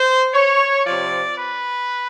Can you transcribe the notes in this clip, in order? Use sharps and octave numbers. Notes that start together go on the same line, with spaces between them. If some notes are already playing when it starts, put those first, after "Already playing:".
Already playing: C5
C#5
C3 F3 D5
B4